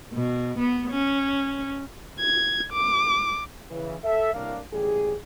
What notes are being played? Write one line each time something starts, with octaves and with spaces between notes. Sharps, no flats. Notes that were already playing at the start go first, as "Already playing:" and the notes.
B2
B3
C#4
G#6
D6
C#3 E3
A4 E5
C2 A2 A#3 D4 F5
A1 D#2 G3 G4 G#4